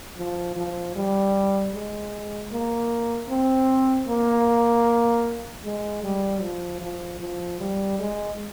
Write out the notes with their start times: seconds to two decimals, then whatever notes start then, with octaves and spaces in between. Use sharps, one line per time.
0.17 F3
0.56 F3
0.95 G3
1.74 G#3
2.52 A#3
3.29 C4
4.07 A#3
5.64 G#3
6.03 G3
6.41 F3
6.81 F3
7.20 F3
7.60 G3
7.99 G#3